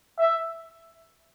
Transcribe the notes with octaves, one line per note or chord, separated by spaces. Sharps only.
E5